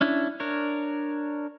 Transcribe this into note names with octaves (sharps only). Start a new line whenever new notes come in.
C#4 D4 E4
D4 A#4 C#5